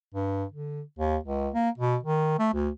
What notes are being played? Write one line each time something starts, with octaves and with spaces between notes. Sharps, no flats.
G2
D3
D#2
C#2
A#3
B2
D#3
A3
D2